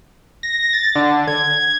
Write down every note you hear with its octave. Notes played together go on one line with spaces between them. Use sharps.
A#6
A6
D3
G#6